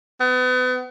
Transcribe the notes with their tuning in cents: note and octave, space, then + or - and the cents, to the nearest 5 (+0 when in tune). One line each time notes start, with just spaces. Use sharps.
B3 +35